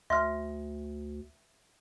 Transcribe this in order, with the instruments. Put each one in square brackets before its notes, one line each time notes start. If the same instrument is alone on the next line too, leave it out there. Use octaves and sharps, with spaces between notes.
[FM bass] D2 [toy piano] E5 [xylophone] C6 F6